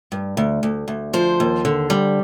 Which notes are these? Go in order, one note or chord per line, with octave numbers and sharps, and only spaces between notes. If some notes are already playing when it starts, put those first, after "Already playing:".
G2
D2
D2
D2
F3 C5
D#2
D3
G3